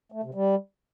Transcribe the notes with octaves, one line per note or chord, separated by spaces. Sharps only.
A3
C3
G3